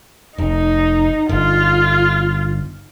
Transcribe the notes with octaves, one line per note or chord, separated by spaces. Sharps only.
F1 D#4
G1 F4